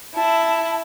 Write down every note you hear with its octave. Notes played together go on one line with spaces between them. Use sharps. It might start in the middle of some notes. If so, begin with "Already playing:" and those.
E4 A5